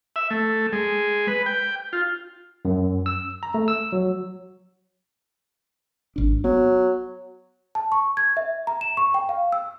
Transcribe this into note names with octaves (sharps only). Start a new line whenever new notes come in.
E5
A3
G#3
B4
G5
F4
F#2
E6
A#5
A3
E6
F#3
G#1 D4
F#3 B3
A5
C#6
G#6
E5
A#5
E7
C#6
G5
F5
E6